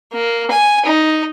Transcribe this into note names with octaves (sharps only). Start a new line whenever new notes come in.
A#3
G#5
D#4